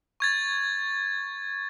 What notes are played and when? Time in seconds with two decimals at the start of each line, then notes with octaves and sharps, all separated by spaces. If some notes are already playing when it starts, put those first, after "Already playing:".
0.20 C#6 G#6 A6